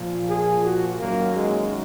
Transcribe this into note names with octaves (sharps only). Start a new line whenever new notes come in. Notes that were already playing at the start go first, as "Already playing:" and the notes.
Already playing: A#2 F3
G#4
F#4
F#2 D#3 F#3 A#3
G#3